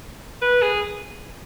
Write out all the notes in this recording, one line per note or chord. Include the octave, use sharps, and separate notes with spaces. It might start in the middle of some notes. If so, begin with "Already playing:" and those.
B4
G#4